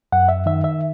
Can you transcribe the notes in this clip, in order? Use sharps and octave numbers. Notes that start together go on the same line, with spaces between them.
F#2 F#5
E5
D#3 E5
E5